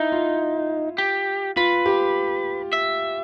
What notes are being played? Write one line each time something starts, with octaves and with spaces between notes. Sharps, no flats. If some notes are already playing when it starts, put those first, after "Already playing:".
Already playing: D#4 E4
F4
G4
F4 B4
G4
E5